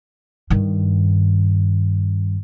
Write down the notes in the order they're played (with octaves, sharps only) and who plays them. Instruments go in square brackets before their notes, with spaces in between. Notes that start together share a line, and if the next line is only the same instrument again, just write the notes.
[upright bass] G2 D#3